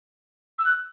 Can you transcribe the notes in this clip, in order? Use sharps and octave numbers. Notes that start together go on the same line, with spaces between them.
E6
F#6